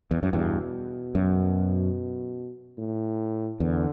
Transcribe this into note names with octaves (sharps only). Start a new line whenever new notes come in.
E2
F#2
E2 G2 B2
F#2
A2
E2 D3